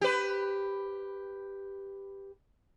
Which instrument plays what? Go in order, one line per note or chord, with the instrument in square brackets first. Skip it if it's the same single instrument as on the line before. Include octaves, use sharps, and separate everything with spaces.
[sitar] G4 B4